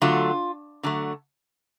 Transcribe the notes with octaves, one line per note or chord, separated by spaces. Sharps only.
D3 F#3 A3 F4
D3 F#3 A3